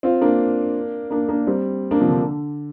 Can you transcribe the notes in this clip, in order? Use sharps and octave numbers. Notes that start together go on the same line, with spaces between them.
C4 F4
A#3 D4
A#3 D4
A#3 D4
G3 C4
A#3 D4
C3 F3
D3